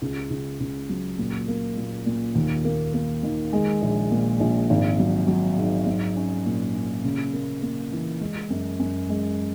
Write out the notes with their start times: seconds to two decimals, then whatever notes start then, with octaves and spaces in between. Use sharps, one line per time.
0.02 C#2
0.30 C#2
0.60 C#2
0.89 F#3
1.18 A#2
1.48 A#3
1.77 A#2
2.06 A#2
2.35 D#2
2.65 A#3
2.94 A#3
3.23 D#3
3.53 G#3
3.82 A#1
4.11 A#2
4.40 A#1
4.70 G#1
4.99 F#3
5.28 F#3
5.58 G#2
5.87 F#3
6.16 C#4
6.46 A#2
6.75 C#4
7.04 C#3
7.33 A#3
7.62 A#3
7.92 E3
8.21 G#3
8.50 F#2
8.80 F#2
9.09 G#3